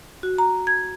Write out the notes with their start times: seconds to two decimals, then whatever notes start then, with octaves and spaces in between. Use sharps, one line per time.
0.23 F#4
0.38 A#5
0.67 G#6